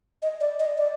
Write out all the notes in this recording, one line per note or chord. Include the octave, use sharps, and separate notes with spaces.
D#5
D5
D#5
D5